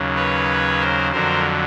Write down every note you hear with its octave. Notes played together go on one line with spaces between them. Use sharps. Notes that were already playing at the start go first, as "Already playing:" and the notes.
Already playing: D#2 C#3 F#3
B4 C#5
A#4 C5
F2 D3 F#3 A#4 C5